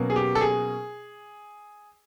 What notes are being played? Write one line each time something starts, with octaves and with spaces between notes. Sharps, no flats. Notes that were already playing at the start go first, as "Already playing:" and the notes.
Already playing: B2 F#3 A#3 C#4
G#4
G4
A4
G#4